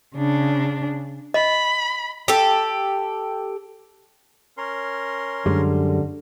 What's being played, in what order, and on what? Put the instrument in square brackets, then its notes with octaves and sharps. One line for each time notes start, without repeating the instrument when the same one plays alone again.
[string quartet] C#3 D4
[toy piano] D#5 [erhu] B5
[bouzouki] G4 A4
[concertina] C#4 A#4 C6
[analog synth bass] F#2 [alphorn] D3 [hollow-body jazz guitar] G3 G#3